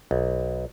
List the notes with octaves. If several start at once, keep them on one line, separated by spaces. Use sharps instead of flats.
B1